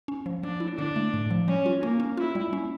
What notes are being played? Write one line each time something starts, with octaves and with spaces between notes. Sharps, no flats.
C#4
F3
F3 D4
E4
D3 D4
A3
A2
F3
G3 C#4
F4
A#3 C#4
C#4
E4 F4
G3
C#4